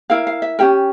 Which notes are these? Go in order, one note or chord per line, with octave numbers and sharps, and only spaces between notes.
E4 A#4 F5
F5
E5
C#4 G4 A#4 G5